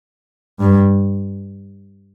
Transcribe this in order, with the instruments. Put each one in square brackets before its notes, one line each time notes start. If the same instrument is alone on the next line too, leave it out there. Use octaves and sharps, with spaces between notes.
[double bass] G2